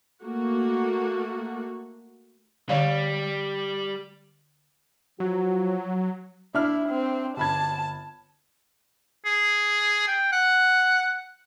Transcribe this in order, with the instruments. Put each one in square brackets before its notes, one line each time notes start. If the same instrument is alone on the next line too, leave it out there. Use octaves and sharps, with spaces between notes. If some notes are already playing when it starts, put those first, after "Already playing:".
[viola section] A3 A#3 F#4
[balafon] D3 D5 F5 [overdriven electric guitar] G3
[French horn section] F3 F#4 [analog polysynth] F#3
[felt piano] D4 [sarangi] E4 [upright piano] E5 F6
[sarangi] C4
[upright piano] G1 B5 G#6 [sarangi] A5
[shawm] G#4
G5
F#5